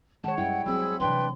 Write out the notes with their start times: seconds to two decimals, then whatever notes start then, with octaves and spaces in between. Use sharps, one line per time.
0.24 D#3 G#3 C#5 F#5 A5
0.38 F#2 G3 E4 G5
0.66 F2 F#3 B3 C4 G#4 B5 E6
1.00 C3 E3 D4 B4 G5 C6